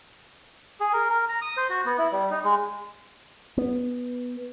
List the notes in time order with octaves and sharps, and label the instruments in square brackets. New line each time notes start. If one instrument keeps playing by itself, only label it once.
[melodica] G#4
A#4
A#4
A#5
D#6
C5
F#4
B3
E4
G3
D#4
G#3
[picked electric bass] B3